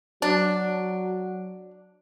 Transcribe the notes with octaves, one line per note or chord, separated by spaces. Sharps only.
F#3 D4